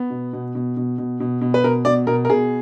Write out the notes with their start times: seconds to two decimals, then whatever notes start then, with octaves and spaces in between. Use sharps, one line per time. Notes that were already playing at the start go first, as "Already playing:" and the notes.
Already playing: B3
0.10 B2
0.33 B2
0.55 B2
0.77 B2
0.98 B2
1.20 B2
1.41 B2
1.54 B4
1.64 B2 A#4
1.85 B2 D5
2.07 B2 A#4
2.25 A#4
2.29 B2 G#4